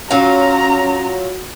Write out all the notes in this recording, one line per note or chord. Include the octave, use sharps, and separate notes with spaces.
F#3 C#4 F4 F#4 A#5